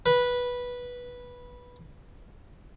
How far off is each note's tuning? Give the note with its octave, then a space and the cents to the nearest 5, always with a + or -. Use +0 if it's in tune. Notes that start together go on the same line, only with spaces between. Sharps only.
B4 -10